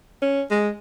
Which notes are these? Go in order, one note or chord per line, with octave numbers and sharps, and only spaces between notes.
C#4
G#3